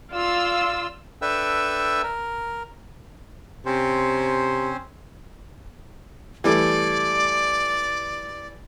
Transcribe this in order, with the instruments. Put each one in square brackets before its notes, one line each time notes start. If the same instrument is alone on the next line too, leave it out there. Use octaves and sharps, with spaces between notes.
[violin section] F4 E6 [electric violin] D5 F5
[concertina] D4 A4 B4 E5 G5 E6
A#4
[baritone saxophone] C3 [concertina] C4 C#4 C5
[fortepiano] E3 G3 A3 [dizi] D5